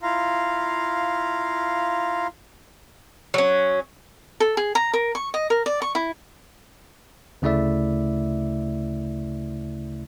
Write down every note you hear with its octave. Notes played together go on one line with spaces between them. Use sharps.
E4 F4 F5 A#5
F#3 C#4
A4
G#4
A#5
A#4
C#6
D#5
A#4
D5
C#6
E4
D2 C#3 A3 E4 D5 E5